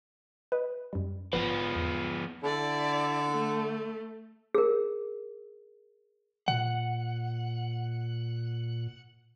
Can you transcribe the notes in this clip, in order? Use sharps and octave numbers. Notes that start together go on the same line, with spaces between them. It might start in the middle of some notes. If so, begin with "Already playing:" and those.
B4 D#5
F#2 G3
A1 F3 B3 B4
E2
D3 E4 D5
A3
G#4 A#4
A#2 F#5